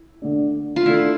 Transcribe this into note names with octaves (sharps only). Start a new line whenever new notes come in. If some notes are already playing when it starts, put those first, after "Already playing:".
Already playing: E4
D3 A3 D4
F4
D3 A3 D4 E4 A4